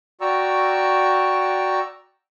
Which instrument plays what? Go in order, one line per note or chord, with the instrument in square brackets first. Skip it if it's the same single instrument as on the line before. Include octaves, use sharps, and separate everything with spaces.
[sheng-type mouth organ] F#4 D5 G5 A#5 C#6 E6